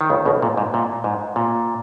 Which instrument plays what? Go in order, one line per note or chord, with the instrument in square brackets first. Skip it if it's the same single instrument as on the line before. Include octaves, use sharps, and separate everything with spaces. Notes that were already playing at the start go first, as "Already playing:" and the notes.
[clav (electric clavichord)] D#3
C#2 C#3
B1 B2
A#2
G#2
A#2
G#2
A#2